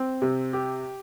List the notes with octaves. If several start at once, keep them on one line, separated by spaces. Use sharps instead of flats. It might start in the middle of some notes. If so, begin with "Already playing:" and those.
Already playing: C4
C3
G4